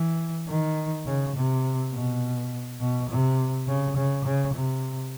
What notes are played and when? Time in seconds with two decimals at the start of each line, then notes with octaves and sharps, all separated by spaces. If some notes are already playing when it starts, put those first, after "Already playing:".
Already playing: E3
0.48 D#3
1.06 C#3
1.36 C3
1.93 B2
2.80 B2
3.09 C3
3.67 C#3
3.96 C#3
4.25 C#3
4.54 C3